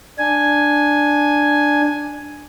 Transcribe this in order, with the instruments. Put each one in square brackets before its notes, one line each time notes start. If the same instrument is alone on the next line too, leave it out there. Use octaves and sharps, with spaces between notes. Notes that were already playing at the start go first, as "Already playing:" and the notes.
[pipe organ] D4 G#5